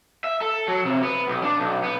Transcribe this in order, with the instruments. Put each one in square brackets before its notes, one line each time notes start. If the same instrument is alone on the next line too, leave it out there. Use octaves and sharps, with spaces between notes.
[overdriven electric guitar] E5
A4
F#3
C3
B3
B1
D4
B1
B3